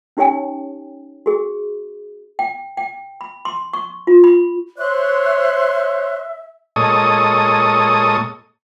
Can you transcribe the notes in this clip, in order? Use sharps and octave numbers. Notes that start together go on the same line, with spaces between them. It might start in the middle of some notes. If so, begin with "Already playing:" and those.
C#4 D#4 G4 C#5 G5 G#5
F#4 G#4
G5
G5
B5
C6
C#6
F4
B5
C5 C#5 E5 C6 F#6
A#2 G#3 A4 C#5 D#5 D#6